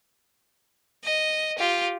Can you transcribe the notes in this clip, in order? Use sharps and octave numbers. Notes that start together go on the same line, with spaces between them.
D#5
F4 G4